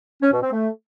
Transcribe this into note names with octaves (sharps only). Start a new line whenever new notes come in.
C#4
B2
C4
A3